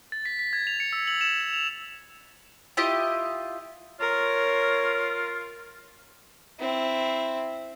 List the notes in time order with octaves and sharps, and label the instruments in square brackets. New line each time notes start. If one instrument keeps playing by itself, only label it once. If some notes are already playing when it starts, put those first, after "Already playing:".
[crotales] A6
B6
B6
G#6
F7
C#7
E6
F#7
E7
F7
F7
[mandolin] E4 F4 G4 D#5
[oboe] F4 [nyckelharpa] A#4 [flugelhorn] C#5
[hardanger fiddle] C4 E4